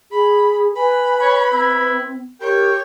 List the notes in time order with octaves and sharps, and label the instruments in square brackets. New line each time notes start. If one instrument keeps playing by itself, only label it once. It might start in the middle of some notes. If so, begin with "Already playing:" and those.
[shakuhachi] G#4 [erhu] B5
[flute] B4 [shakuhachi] G#5 [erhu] B5
[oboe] C#5
[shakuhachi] C4 [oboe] E4
[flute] G4 [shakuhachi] A#4 [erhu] C#5 [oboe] G5